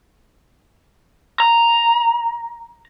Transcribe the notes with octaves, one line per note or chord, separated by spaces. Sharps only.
A#5